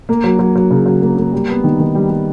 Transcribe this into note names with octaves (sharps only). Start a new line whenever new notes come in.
A#3
F#3
F#3
F#3
C#3
F#3
A#3
A#3
G3
B3
D#3
D#3
G3
G3